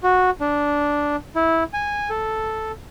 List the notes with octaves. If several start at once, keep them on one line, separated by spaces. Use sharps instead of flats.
F#4
D4
E4
G#5
A4